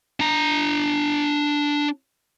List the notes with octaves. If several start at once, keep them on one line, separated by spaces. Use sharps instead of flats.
D4 A#5